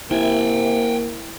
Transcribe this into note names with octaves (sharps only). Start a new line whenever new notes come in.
C3 A#3 E4 G5 G#5